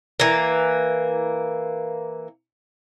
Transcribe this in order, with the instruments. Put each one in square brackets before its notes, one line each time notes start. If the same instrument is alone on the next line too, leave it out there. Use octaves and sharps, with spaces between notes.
[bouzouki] E3 A#3